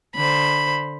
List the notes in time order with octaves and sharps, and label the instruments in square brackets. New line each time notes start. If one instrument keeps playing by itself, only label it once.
[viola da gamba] D3 C5 [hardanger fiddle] B5